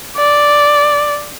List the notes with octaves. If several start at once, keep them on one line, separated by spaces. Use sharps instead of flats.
D5